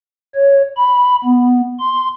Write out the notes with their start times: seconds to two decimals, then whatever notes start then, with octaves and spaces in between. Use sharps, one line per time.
0.35 C#5
0.77 B5
1.24 B3
1.80 C6